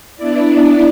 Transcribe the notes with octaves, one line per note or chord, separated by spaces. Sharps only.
B3 D4 E4 D5